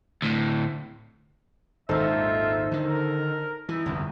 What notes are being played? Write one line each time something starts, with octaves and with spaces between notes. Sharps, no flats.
D2 A2
G#1 D#2 A#2 D#4 F4 A4 C5 E5
D3 D#3
A#4
E3 D#4 E4
G1 C2 F2